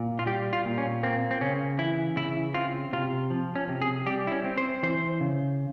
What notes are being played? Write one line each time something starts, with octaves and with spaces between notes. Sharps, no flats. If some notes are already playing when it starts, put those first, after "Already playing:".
Already playing: A#2
F4
G3 G4
F4
A#2
C#4
A#3 C4
C4
C#3 C#4
E3 E4
C#3 E4
C4 F4
C3 F4
F3
C#4
C3
G#4
G3 G4
E4
C#4
C4
C5
E3 C5
C#3